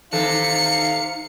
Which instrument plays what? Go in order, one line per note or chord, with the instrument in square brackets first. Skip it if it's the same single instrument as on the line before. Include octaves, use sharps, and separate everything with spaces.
[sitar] C3 D#3 A4 [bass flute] D#4 [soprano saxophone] F5 [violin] C#7